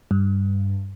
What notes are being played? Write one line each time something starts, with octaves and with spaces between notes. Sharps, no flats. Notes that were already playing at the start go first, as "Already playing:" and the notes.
G2